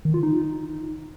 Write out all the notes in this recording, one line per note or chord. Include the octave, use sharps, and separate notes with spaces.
D#3
F4
D#4